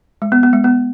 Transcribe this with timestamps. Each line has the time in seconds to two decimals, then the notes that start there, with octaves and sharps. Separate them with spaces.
0.22 G#3
0.32 B3
0.43 B3
0.53 G#3
0.64 B3